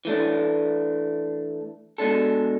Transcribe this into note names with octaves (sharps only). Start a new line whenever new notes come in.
E3 A3 D4
B2 G#3 D4 A4